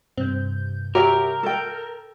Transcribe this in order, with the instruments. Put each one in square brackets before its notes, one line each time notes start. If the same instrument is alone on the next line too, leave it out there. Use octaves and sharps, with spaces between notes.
[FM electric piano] G2 C3 G6 [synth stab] C4
[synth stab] F#4 C#5 E5 [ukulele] G4 [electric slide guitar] A#4
[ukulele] A4 G5